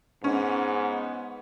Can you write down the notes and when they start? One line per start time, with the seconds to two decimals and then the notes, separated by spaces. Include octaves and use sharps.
0.24 G#2 B3 C#4